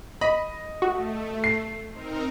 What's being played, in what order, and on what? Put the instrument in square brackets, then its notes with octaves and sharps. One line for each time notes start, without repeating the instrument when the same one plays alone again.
[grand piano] D#5 [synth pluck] B5
[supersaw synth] A3 [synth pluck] F#4
[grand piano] C7
[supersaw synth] C4 D#4 A#4